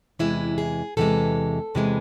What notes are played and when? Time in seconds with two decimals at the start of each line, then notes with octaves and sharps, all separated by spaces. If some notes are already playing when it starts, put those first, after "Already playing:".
0.19 E2 C3 E3 G#3 E4
0.58 G#4
0.97 E2 C3 E3 G#3 A4
1.75 E2 C3 E3 G#3